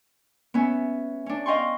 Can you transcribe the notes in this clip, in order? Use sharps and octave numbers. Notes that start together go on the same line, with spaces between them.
B3 C#4 E5
C#4 D4
D#5 F5 G5 C6 C#6